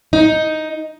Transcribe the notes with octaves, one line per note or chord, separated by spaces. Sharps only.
D#4